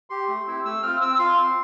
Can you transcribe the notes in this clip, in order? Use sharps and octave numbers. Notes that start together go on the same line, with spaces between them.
G4 C6
A3
C4 E4 G4
A3 E6
C4 F4 F6
C4 E6
F4 C6
C4